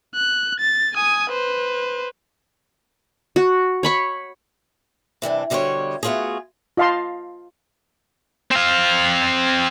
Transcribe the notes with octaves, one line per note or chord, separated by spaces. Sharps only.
F#6
A6
G#5 D#6
B4 C5
F#4
C#5 B5 C#6
C3 E3 G3 D4
B2 D3 G3 E4 C5 C#5
A3 B3 C4 F4 F#4 G#4
F4 D#5 F5 A5 C6
C4 F5